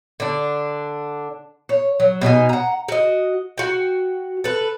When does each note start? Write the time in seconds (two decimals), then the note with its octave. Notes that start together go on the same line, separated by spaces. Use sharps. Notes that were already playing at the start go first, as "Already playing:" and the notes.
0.20 D3 D4
1.69 C#5
2.00 F#3
2.21 B2 D#4 G4 G#5
2.49 F#5 A#5
2.88 F#4 D#5
3.58 F#4 G5
4.44 A4 B4